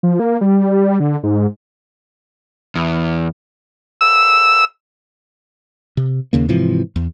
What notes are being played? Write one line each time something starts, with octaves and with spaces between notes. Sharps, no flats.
F3
A#3
G3
D3
G#2
E2
E6
C3
D#2 C#3 A#3
G#2 C3 E3 F3
E2